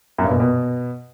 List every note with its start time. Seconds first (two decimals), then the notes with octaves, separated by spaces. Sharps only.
0.18 F#2
0.24 G2
0.29 B2
0.34 A#2
0.40 B2